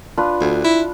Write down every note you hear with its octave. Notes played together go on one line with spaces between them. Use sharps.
D4 F4 B4
D2
E4